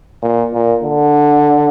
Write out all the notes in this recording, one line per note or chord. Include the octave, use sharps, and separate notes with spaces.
A#2
A#2
D3